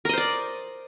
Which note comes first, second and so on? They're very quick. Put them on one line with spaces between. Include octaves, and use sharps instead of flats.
A#4 D#5 C5 D5